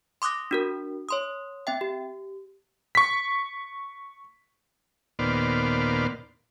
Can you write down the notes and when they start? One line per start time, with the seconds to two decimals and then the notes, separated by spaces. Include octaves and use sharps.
0.22 C6 D6 D#6 F#6 A#6
0.51 D4 F#4 A#4
1.09 C#5 C6 D#6
1.67 C4 E5 G5
1.81 G4
2.95 C#6 B6
5.19 D#2 A#2 B3 C5 D5 F6